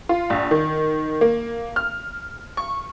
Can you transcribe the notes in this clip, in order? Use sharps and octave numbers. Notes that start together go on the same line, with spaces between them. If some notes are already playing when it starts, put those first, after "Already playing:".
F4
A#1
D#3
A#3
F6
C#6